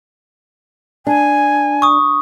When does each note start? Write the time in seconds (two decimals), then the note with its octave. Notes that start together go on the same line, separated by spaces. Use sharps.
1.07 D4 G#5
1.82 C#6 D#6